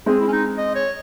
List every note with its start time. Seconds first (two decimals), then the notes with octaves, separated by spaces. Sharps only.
0.06 G#3 C4 G#4
0.20 E4
0.28 C#4
0.33 D#4
0.58 D#5
0.75 C#5